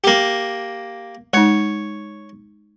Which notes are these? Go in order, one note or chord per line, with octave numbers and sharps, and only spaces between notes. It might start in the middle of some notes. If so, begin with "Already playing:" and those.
A#3 G4
G#3 D#4 C#5